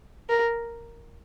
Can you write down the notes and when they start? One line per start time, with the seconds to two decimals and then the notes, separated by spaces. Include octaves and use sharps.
0.29 A#4